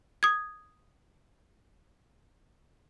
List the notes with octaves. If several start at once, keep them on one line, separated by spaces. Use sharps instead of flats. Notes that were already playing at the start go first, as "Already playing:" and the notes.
D#6 G#6